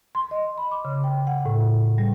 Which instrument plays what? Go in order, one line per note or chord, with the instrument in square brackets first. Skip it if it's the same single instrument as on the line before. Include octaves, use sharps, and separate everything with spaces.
[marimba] C6
D#5
B5
D6
C#3
G5
F#5
A2
G3